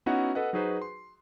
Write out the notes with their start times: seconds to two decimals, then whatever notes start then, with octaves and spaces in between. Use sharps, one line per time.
0.06 B3 C#4 D#4 E4 F#4 F#5
0.35 A4 B4 D#5 F#5
0.53 F#3 D#4 F#4 G#4 B4 C5
0.82 C6